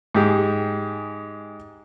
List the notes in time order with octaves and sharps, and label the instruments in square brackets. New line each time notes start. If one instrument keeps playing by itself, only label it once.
[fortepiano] G#2 G4 G#4